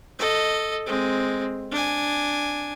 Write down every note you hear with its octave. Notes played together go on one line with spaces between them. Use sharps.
A4 D#5
G#3 C4
D4 G#5